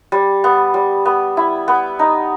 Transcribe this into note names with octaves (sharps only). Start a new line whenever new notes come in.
G3
B3
G3
B3
E4
B3
D#4